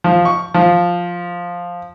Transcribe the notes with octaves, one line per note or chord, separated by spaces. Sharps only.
F3
C#6
F3